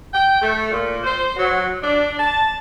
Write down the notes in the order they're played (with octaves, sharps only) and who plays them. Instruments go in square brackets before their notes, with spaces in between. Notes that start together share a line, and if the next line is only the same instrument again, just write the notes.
[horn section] G5
A3
A#2
C5
F#3
D4
A5